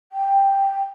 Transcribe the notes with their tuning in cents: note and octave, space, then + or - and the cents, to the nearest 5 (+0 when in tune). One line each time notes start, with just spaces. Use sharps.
G5 +5